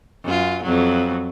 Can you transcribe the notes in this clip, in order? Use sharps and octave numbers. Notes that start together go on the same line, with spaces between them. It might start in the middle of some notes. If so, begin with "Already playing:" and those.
F#2 F4
F2 F#3